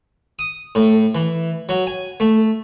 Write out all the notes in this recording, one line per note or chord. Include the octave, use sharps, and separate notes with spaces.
D#6
A2
E3
F#3
G#5
A3